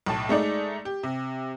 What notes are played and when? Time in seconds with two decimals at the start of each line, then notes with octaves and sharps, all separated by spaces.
0.06 B1 A2 A5
0.29 G#3 A3 D#4 D5
0.85 G4
1.03 C3